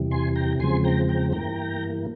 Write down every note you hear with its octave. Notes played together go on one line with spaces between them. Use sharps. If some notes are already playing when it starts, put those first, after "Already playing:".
Already playing: E2 C3 E3 G3
G#5 C6
G5 A#5
E2 C#3 F3 G#3 C4 G#5 C6
G5 A#5
G5 A#5
G2 E3 A#3 G5 A#5